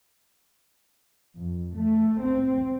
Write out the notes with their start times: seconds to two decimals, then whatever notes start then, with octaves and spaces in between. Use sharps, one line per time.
1.36 F2
1.77 A3
2.22 C4